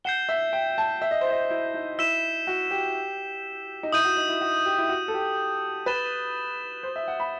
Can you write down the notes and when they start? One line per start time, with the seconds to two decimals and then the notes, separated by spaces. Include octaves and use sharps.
0.05 F#5 G6 C7 E7 G7
0.29 E5
0.53 G5
0.78 A5
1.02 E5
1.11 D#5
1.21 C5
1.31 D#5
1.51 E4
1.74 D#4
1.98 E4 E6 B6 E7
2.47 F#4
2.71 G4
3.83 D#4
3.92 E4 D#6 G6 D#7
4.05 F#4
4.17 D#4
4.29 E4
4.41 F#4
4.66 G4
4.79 E4
4.89 F#4
5.08 A4
5.14 G4
5.86 B4 A6 E7 G7
6.83 C5
6.96 E5
7.08 F#5
7.20 B5